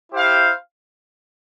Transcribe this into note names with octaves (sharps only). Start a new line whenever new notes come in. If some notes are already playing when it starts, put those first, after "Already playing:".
E4 G4 C5 F5